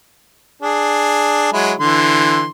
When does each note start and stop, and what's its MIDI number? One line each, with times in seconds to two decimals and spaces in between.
0.62 1.50 62
0.62 1.50 68
1.53 1.73 54
1.53 1.73 56
1.53 1.73 64
1.80 2.49 50
1.80 2.49 52
1.80 2.49 84